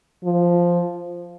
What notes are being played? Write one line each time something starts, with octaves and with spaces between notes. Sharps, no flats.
F3